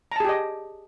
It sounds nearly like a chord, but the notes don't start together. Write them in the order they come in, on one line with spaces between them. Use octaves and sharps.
A#5 A5 G#4 G4 D#5